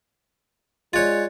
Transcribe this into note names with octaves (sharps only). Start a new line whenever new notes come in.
G#3 F4 C#5 D5 F#6 A6